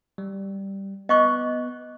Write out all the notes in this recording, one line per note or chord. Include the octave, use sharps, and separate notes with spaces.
G3
B3 D#5 C#6 D6 F#6